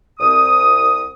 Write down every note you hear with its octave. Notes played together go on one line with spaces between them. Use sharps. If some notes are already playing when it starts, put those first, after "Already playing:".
C2 D#6